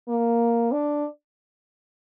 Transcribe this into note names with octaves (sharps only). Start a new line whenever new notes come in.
A#3
D4